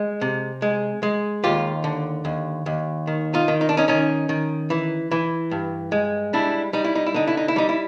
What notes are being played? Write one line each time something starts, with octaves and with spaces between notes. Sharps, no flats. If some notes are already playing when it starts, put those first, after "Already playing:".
Already playing: G#3
C3
G#3
G#3
D#2 F4 G4
D3
D#2
D#2
D#3
D#4 F4
D#3
D#4
D4
C#4 D#4
D#3 C#4 D#4
D#3
E3
E3
G2
G#3
G3 D4 E4
G3 D#4
E4
D#4
E4
D3 D#4
E4
D#4
E4
G3 D#4
E4